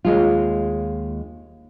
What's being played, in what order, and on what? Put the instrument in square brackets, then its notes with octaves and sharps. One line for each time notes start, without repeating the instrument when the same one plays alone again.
[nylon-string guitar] D#2 G#3 F4